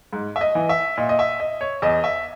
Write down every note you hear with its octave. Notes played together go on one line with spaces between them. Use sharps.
G#2
E5
D#5
E3
E5
A#2 D#5
D#5
E5
D#5
C#5
E2 D#5
E5